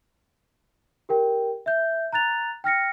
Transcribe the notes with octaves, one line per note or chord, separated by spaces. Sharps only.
G4 A#4 G5
E5 G6
A#5 F#6 A6 F7
G5 F6 A#6 C#7